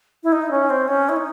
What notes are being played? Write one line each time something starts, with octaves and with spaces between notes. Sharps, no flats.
E4
D#4
C#4
C4
C#4
E4
D#4